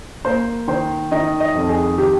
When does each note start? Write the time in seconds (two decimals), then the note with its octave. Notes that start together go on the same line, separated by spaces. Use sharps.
0.25 A#3 C5
0.68 D#3 C5
1.12 D#3 D#5
1.40 D#5
1.55 F2
1.69 G#4
1.98 D#3 G4